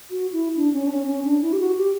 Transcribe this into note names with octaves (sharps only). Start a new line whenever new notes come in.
F#4
E4
D4
C#4
D4
C#4
C#4
D4
E4
G4
F#4
G4